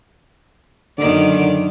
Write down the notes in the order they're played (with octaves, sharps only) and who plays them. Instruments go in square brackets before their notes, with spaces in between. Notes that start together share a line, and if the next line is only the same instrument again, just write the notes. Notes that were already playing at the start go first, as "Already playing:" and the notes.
[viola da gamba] F#2 D#3 D5 [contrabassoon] D3